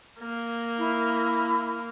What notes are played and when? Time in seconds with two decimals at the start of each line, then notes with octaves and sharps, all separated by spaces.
0.21 A#3
0.78 E4